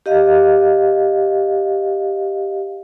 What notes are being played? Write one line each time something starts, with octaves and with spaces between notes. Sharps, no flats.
G4 D#5 F5